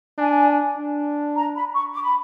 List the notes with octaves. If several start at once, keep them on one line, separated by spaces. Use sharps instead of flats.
D4 G#5
D4
A#5
B5
C#6
D6
B5